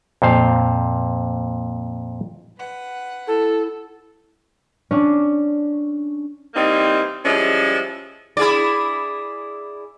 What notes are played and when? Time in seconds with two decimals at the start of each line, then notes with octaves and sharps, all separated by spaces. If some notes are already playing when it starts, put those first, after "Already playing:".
0.22 F2 A#2 C5 F5
2.57 B4 F#5
3.27 E4 A4
4.91 C#4 D4
6.55 E3 G3 A#3 C4 D#4
7.24 F3 G3 G#3 C#4 E4
8.37 E4 G#4 D5